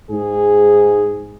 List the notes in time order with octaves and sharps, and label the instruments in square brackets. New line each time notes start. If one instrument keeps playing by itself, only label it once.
[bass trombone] G#2 [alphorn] G#4